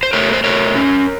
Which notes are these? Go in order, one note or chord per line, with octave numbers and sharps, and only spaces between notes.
C5
A3 A#4 C#5
C5
A3 A#4 C#5
C#4